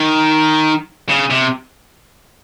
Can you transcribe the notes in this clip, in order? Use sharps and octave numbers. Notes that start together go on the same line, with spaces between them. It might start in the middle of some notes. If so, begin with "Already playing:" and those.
Already playing: D#3
C#3
C3